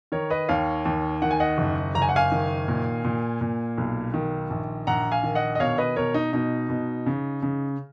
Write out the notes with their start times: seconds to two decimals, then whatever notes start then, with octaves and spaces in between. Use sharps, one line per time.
0.12 D#3 A#4 C#5
0.30 B4 D#5
0.49 D#2 C#5 F5
0.85 D#2
1.22 D#3 F#5
1.31 G#5
1.40 D#5 F#5
1.58 F#1
1.95 F#1 A#5
2.02 G#5
2.09 F#5
2.16 F5 G#5
2.32 D#3
2.68 A#2
3.04 A#2
3.41 A#2
3.78 B1
4.14 D#3
4.50 A#1
4.87 A#1 F#5 A#5
5.12 F5 G#5
5.23 D#3
5.35 D#5 F#5
5.55 D#5
5.60 B2 C#5 F5
5.78 B4 D#5
5.96 B2 A#4 C#5
6.14 D#4
6.33 B2 D#4
6.69 B2
7.06 C#3
7.42 C#3